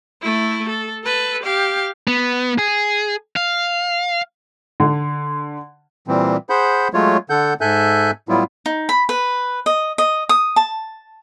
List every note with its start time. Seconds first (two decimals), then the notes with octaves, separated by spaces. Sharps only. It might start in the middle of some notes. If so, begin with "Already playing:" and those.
0.22 A3 E4
0.69 A4
1.04 A4 B4
1.43 G4 F5
2.07 B3
2.58 G#4
3.36 F5
4.80 D3
6.08 A#2 E3 G3 C4
6.50 G#4 C5 F#5 B5 G6
6.94 F#3 G#3 A3 F4 C#5
7.30 D3 A4 F#5 G6
7.61 G#2 A4 E5 G#5 F#6 G6
8.29 A2 F#3 G3 B3 E4 F4
8.66 D#4
8.89 B5
9.09 B4
9.66 D#5
9.98 D#5
10.29 D#6
10.56 A5